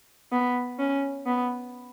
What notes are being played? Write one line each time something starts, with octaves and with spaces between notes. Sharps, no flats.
B3
C#4
B3